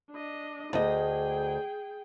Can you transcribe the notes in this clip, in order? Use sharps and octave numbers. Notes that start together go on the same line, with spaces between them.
D4 D#5
D2 G#4 D#5 G5